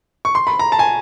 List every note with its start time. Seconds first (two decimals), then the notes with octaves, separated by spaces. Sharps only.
0.25 C#6
0.35 C6
0.47 B5
0.59 A#5
0.72 A5
0.79 G#5